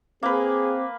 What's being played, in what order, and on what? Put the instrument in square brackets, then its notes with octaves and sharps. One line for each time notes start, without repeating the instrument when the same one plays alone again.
[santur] A#3 B4 [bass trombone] C4 [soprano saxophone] G#4